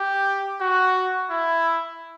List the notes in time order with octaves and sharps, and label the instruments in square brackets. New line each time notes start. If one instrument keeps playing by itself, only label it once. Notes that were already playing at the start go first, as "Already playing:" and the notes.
Already playing: [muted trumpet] G4
F#4
E4